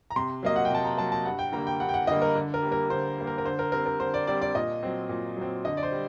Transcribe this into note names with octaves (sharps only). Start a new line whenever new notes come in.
A#5
C3 C6
F#3 A#3 D#5
F#5
G5
C3 A5
A#5
F#3 A#3 A5
A5
G2 F#5
G5
D3 G3 A#3 A#5
G5
G2 F#5
G5
F#5
D3 G3 A#3 D#5
A#4
D3
A#4
G3 A#3
A#4
D3 C5
G3 A#3
A#4
A#4
D3 C5
A#4
G3 C4 A#4
A#4
D3 C5
D5
G3 C4 D5
D5
A#2 D#5
F#3 C4
A#2
F#3 C4
D3 D#5
D5
C5
G3